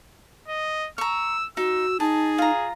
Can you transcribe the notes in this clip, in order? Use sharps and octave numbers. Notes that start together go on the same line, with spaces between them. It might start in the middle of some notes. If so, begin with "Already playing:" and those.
D#5
A#5 C#6 E6
D#4 F#4 E6
D#4 G#4 A5
F4 A#5